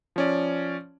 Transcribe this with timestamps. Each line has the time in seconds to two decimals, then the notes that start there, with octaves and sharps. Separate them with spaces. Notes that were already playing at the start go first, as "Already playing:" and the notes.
0.16 F3 C#4 D5